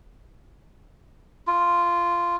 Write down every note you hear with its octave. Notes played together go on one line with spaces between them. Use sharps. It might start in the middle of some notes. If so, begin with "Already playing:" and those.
F4